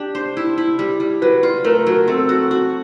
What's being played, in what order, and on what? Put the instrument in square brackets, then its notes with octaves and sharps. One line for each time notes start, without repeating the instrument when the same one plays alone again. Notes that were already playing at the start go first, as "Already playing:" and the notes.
Already playing: [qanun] D4 G4
C5
E4
E4
G3
G3
[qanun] F#3 [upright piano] B4
[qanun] F4
[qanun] A3 [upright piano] A#4
[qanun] F#3
[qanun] C4 [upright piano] A4
[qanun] F#4
F#4